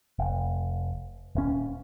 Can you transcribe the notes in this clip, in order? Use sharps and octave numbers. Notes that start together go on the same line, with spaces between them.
F1
D#1 C#4